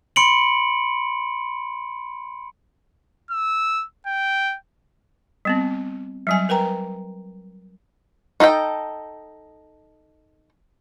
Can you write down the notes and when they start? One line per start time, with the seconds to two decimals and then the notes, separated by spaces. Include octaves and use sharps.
0.16 B5 C6 C#7 D7 F#7
3.31 E6
4.06 G5
5.45 G3 B3 C4
6.27 F#3 G3 G#5
6.49 A#4 B4 G5 A#5
8.40 D#4 A4 D#5 G5